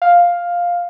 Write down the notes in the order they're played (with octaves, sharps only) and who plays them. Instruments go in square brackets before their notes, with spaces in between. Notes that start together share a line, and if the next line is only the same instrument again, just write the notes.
[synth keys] F5